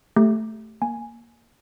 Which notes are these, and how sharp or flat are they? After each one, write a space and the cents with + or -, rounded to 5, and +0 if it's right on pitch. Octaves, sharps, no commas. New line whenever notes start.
A3 +0 G4 +0
A#3 +0 G#5 +0